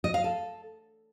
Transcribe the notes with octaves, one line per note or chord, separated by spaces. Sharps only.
D#5
F5
A4